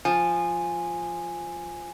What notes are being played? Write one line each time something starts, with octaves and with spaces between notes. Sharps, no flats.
F3 G#5